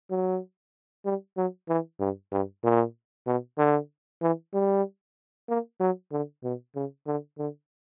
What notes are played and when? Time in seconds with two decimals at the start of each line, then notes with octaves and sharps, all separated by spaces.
0.10 F#3
1.05 G3
1.37 F#3
1.69 E3
2.00 G2
2.32 G2
2.64 A#2
3.27 B2
3.58 D3
4.22 E3
4.54 G3
5.49 A#3
5.80 F#3
6.12 D3
6.44 B2
6.75 C#3
7.07 D3
7.38 D3